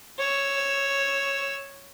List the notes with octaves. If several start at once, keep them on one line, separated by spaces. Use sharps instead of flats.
C#5 E6